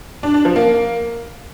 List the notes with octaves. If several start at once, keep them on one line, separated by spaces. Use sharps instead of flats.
D4
D4
F3
A#3